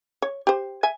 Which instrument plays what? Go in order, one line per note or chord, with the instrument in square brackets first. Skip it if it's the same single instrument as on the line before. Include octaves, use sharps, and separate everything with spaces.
[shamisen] C#5
G4 C5
E5 G#5